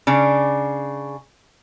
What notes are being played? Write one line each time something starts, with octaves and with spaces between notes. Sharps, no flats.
C#3 D4